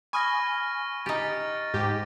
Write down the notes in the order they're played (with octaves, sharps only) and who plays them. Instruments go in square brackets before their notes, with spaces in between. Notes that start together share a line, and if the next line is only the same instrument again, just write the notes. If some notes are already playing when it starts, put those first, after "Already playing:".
[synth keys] G#5 [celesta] B5 D#6 [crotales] C#6 F6 A#6
[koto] D#4 G4 [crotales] A6 D7
[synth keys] G#2 G4